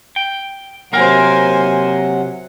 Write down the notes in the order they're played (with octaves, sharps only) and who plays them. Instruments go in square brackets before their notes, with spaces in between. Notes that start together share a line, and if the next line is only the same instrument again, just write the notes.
[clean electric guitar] G5
[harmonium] C3 F#3 F#5 [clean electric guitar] A#3 A#4 [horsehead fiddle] C5 G#5